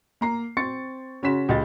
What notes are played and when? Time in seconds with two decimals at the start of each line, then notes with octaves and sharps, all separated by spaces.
0.21 A#3 A#5 C7
0.57 C4 C6 C#6 A6 C#7
1.23 C#3 C#4 F#4 C6 B6 E7
1.49 C#2 G4 D#5 A6